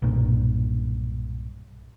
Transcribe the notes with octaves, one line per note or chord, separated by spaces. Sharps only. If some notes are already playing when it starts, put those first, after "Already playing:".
B1 G2 A#2